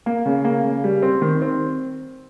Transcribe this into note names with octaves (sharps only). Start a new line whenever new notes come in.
A#3
C#3
A#3
C#3
G3
C4
D#3
C4